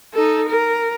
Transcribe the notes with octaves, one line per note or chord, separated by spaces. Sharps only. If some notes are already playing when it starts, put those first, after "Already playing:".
D#4 A4
A#4